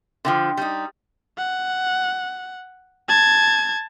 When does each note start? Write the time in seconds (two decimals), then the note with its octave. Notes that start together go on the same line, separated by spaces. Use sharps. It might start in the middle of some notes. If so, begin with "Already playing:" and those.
0.25 D3 E3 F3 G5 C6
0.57 G3 D#4
1.38 F#5
3.08 A5 G#6